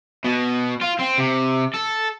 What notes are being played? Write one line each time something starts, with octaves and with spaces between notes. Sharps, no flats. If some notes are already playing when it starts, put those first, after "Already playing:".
B2
F4
C4
C3
A4